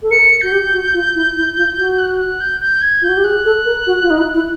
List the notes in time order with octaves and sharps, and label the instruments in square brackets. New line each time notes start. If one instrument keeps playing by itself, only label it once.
[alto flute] A4
[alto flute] A#4 [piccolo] C#7
[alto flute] F#4 [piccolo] G6
[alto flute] G4
F#4
F4
E4
E4
F4
F#4
[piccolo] F#6
F#6
G6
G6
G#6
[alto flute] F4 [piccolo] G6
[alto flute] F#4
G4
[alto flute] G#4 [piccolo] F#6
[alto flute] A4
A#4
F#4
F4
D#4
E4
E4